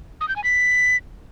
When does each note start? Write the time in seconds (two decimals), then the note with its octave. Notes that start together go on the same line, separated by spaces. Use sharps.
0.21 D#6
0.28 G6
0.36 G#5
0.44 B6